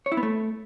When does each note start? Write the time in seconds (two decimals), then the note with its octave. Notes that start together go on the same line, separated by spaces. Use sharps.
0.06 C#5
0.12 E4
0.17 B3
0.23 A3